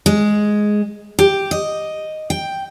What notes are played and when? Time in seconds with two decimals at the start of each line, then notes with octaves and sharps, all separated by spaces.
0.06 G#3
1.19 G4
1.51 D#5
2.30 G5